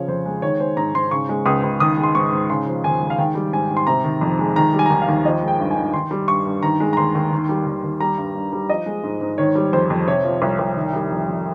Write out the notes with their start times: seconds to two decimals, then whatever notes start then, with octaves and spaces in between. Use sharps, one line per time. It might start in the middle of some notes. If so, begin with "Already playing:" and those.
Already playing: C#3 F3 C#5
0.08 F2 C5
0.26 G#3
0.42 D#3 C#5
0.60 G#3 C5
0.77 G#2 A#5
0.94 G#2 C6
1.11 C#3 C#6
1.29 G#3
1.46 C#2 D#6
1.63 C#2
1.80 D#3 D#6
1.97 G#3
2.03 C6
2.15 G#2 C#6
2.32 G#2
2.50 C#3 C6
2.67 F3
2.84 D#2 G#5
3.02 G#3
3.10 F5
3.18 D#3 G5
3.35 G3
3.53 G#2 G#5
3.70 G#2
3.77 C6
3.87 C3 A#5
4.04 D#3
4.21 F2
4.39 G#3
4.56 D#3 A#5
4.74 G3
4.79 G#5
4.86 A#5
4.90 D#2 G#5
5.02 F5
5.08 D#2
5.25 F3 D#5
5.43 G#3
5.48 G5
5.60 G2
5.71 G#5
5.76 G2
5.94 D#3 C6
6.11 G3
6.28 G2 C#6
6.45 G2
6.63 D#3 A#5
6.80 G#3
6.93 A#5
6.97 D#2 C6
7.15 D#2
7.32 D#3
7.49 G3
7.66 D#2
7.84 D#2
8.00 G3 A#5
8.18 G2
8.35 G2
8.53 G3
8.69 F3 D#5
8.86 G#3
9.04 G#2
9.21 G#2
9.38 D#3 C#5
9.56 G3
9.73 F2 C5
9.90 F2
10.07 C3 C#5
10.25 F3
10.42 C2 C#5
10.59 C2
10.76 D#3
10.93 G3
11.11 F2
11.28 F2